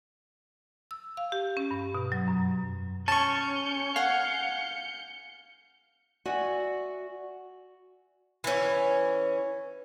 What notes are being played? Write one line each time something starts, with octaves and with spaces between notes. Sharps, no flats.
E6
F5
G4
C#4
G2
B2
F#3
F#2
C#4 A5 C#6 G6 C#7
F5 F#5 G#5
F#4 D5 E5 F#5 G#5
E3 C#4